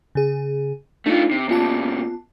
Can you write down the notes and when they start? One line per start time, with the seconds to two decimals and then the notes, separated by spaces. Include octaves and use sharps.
0.15 C#3 G#4
1.06 A3 D4 D#4 F4
1.31 C3
1.49 A#2 C#3 B3 F4 A5